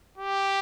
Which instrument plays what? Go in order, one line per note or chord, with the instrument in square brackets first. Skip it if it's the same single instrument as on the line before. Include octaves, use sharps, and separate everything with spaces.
[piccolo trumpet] G4